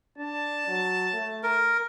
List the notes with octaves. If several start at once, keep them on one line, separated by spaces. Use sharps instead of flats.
D4 A5
F#3
A3
A#4